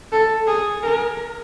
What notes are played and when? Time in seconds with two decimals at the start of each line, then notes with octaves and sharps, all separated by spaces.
0.12 A4
0.47 G#4
0.83 A#4